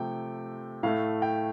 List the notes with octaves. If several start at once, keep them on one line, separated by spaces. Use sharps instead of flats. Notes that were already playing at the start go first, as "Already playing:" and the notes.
Already playing: C3 F3 A3 G5
A2 A3 F5
G5